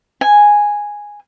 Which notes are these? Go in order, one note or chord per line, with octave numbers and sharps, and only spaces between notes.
G#5